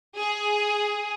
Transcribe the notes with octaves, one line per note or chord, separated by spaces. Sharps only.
G#4